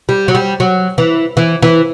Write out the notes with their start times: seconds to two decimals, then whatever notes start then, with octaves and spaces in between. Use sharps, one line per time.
0.09 G3
0.28 F#3
0.35 G3
0.60 F#3
0.98 E3
1.37 E3
1.62 E3